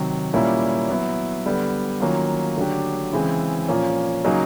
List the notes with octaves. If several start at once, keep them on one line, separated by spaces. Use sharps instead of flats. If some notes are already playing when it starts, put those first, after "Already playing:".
Already playing: C3 D#3 F#3
A#2 G3 A#3 C#4 E4
F#3 B3 E4
D3 G3 B3
D#3 F#3 A#3 C#4 F4
D3 F#3 A3 D4 G4
C#3 E3 G#3 C4 E4
A#2 F3 A#3 C#4
C#3 F#3 A#3 D#4 G#4